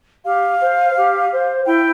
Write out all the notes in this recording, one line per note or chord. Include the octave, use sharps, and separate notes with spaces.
G4 F5
C5
G4
C5
E4 G5